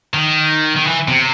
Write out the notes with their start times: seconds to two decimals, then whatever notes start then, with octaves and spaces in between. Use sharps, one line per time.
0.14 D#3
0.77 D#3
0.87 E3
1.08 C3